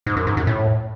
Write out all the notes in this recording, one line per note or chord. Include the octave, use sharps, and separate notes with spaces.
G#2
F#2
G#2
F#2
A2